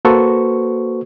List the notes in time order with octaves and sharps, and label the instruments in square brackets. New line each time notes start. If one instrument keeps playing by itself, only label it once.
[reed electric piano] A#3 F#4 A4 B4 C5 C#6